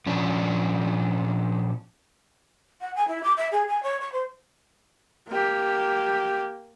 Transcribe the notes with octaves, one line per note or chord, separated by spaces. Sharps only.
A#2 F3 C#4 D4
F#5
G#5
E4
D6
E5
G#4
G#5
C#5
C#6
C5
A#3 G4